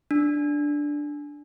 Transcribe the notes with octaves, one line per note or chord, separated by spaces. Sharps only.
D4